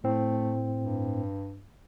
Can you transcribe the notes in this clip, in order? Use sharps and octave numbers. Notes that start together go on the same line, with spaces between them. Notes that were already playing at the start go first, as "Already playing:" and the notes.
A2 A3 C4
G2